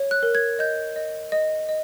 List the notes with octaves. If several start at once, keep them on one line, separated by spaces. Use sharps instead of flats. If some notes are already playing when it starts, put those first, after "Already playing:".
Already playing: C#5
F#6
A#4
G#6
D#5 G6
D#5
D#5
D#5